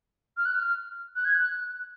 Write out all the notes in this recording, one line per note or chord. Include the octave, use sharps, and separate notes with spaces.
F6
F#6
F6
F#6
G#6
F#6